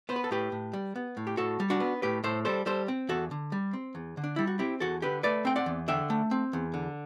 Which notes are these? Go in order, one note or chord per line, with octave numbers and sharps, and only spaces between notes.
B3 C5
B4
A4
A2 G4 B4
A2
G3
B3
A2
G4
A2 F#4 A4
G3
D4 F#4
B3
A2 G4 B4
A2 A4 C5
G3 A4 C5
G3 A4 C5
C4
E2 F#4 A4
D3
G3
C4
E2
D3
D4
G3 E4
F#4
C4 E4 G4
E2 F#4 A4
D3 G4 B4
A3 B4 D5
C4 G5
D5 F#5
E2
D3 E5 G5
A3
C4
E2
D3